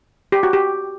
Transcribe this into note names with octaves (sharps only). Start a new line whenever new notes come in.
G4
F#4
G4